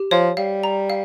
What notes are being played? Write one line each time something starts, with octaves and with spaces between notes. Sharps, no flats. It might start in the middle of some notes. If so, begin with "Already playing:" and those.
Already playing: G4
F3 C#5
G3 F5
A#5
F5